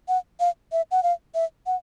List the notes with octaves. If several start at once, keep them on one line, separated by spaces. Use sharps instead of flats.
F#5
F5
E5
F#5
F5
E5
F#5